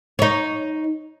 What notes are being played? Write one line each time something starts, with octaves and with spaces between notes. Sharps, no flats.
D#4 C#5